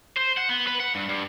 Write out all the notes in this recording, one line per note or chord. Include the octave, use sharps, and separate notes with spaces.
C5
F#5
B3
B4
F#5
G2
G2